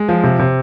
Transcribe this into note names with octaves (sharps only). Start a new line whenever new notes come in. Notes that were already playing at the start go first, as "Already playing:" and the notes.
Already playing: G#3
F3
C3
C3